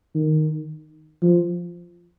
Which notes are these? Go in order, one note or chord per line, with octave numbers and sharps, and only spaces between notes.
D#3
F3